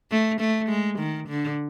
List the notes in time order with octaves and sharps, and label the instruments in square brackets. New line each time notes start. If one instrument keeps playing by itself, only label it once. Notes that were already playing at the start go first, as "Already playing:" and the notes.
[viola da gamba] A3
A3
G#3
D#3
D3